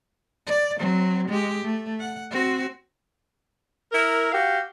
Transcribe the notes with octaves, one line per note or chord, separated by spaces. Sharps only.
D5
F#3 C4
G#3 G4
A3
F#5
C4 F#4
E4 A#4
F#4 G4 F5